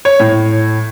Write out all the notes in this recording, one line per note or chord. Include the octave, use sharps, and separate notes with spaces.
C#5
A2